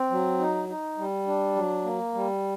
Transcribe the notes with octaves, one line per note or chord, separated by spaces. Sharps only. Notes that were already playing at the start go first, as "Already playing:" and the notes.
Already playing: C4
F#3
D#4
D#4
G3
D4
F#3
A#3
G3